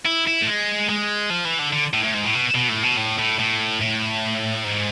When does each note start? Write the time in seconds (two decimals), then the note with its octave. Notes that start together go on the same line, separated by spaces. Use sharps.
0.05 E4
0.27 E4
0.42 A3
0.47 G#3
0.89 G#3
1.30 F3
1.45 E3
1.59 D3
1.73 D3
1.94 A2
2.04 A2
2.14 G#2
2.24 A2
2.36 B2
2.55 B2
2.69 A2
2.84 B2
2.98 A2
3.19 A2
3.39 A2
3.81 A2
4.64 G#2